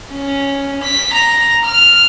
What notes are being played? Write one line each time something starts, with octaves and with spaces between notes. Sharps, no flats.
C#4
B6
A#5
F6